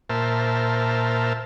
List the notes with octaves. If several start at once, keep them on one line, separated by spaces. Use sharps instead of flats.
A#2 A#4 C5 E5 A5 F6